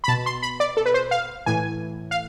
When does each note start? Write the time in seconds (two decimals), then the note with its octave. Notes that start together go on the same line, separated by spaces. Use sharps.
0.04 B5
0.08 B2 A5
0.26 C6
0.42 B5
0.60 D5
0.77 A4
0.86 B4
0.94 C5
1.11 F5
1.46 A2 E3 G#5
2.11 F5